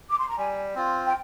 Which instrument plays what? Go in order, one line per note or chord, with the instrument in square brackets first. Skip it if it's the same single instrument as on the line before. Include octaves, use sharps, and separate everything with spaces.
[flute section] D6
C6
A#5
[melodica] G3 [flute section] G#5
[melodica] C4 F4
[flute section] G5